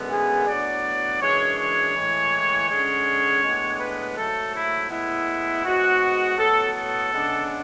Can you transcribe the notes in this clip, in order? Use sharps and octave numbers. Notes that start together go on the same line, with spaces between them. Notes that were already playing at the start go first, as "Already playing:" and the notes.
Already playing: F#2 D3 G#3 B3
G#4
A2 F#3 B3 D4 D5
F#2 E3 G#3 D4 C#5
C#5
A2 E3 G#3
D3 G#3 C#4 C#5
A2 G#3 B3 D4
B4
G#2 F#3 A3 A4
E4
A2 G#3 B3 E4
G#2 G#3 B3 F#4
A2 F#3 B3 A4
A4
C#3 G#3 B3 D4